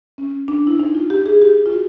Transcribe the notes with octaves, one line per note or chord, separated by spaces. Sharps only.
C#4
D4
E4
D#4
F4
G4
G#4
G4
F4
F#4